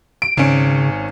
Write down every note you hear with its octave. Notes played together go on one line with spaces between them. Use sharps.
D7
G#1 C#3 C#4